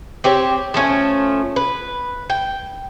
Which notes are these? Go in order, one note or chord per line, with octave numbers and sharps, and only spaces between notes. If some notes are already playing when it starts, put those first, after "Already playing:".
C4 G4 C5 C#5
F3 A3 C#4
B4
G5